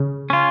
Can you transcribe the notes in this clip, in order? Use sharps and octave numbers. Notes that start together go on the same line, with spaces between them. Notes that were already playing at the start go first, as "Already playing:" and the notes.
Already playing: C#3
C#4 F4